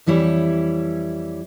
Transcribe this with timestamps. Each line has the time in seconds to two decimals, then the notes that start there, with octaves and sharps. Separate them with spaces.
0.06 F2 E3 G3 E4 C#5